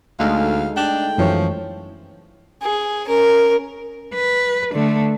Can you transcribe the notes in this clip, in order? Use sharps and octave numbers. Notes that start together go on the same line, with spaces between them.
D2 G#3 A3 D#4 F5
D4 G5
F#2 E3 F3 C#5
G#4
C#4 A#4
B4
D3 A3